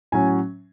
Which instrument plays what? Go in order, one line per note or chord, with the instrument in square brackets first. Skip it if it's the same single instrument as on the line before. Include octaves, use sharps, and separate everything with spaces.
[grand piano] A2 F#3 C#4 G#5